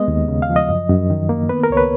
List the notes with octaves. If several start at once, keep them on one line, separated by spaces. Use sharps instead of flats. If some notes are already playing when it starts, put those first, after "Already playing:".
Already playing: G#3 B3 D#5
D#2
C#3
F5
F3
D#5
F#2
F#2
D#3
A#3
B3 B4
A#4
C#2 C#5
B4